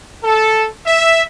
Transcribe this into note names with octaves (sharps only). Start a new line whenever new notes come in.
A4
E5